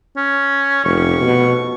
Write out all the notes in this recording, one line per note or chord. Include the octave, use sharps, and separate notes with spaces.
C#4
F1 C#6
B2